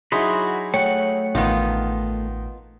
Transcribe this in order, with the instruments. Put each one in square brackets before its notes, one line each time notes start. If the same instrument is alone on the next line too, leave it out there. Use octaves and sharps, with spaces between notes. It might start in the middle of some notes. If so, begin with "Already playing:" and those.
[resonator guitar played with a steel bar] F#3 [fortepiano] D#4 E4 G#4 [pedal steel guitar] F#4 B5 C6
[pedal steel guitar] A3 F#5 [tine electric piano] C#5 G5 C#7
[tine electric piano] A1 [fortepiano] D#3 [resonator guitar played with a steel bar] B3 D#4 F4